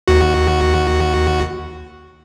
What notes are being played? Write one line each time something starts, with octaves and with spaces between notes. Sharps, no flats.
D#2 F#4